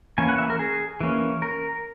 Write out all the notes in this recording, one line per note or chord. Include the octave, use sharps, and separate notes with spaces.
E3 A#3 C#4 G#5
F#5
E5
A#4
G#4
E3 A#3 C#4
A#4